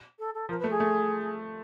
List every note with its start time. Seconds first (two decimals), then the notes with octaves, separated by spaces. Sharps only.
0.18 A4
0.34 A4
0.49 F3 A#4
0.59 B4
0.64 A3
0.70 G#4
0.80 A3